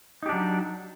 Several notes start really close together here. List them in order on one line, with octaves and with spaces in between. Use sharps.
D#4 G4 D4 F#3